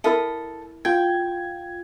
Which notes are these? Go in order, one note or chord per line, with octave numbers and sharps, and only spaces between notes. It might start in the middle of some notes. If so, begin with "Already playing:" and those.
E4 A4 A#4 E5 D#6
F4 G5 G#6